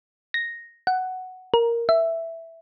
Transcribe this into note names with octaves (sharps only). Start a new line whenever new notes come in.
A#6
F#5
A#4
E5